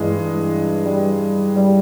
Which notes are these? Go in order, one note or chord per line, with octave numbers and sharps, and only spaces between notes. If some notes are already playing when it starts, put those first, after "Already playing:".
Already playing: G2 E3 G#3
G3
G3